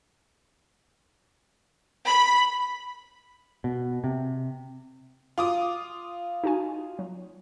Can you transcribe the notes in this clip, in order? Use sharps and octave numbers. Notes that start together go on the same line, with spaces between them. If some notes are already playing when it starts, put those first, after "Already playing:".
B5
B2
C3
F4 D6 D#6
D#4 F#4 G#5
F#3